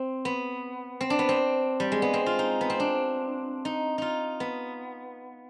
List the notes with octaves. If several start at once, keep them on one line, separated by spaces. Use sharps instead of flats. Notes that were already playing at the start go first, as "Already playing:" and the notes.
Already playing: C4
B3
C4
D4
B3
C4
G3
G#3
B3
C4
F4
D#4
B3
C4
D4
D#4
D#4 F4
B3